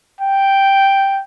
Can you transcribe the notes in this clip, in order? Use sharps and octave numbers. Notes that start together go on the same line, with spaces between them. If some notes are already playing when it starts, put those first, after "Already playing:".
G5